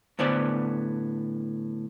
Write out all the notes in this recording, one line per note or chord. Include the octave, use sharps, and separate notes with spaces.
A2 D3 B3 C5 D5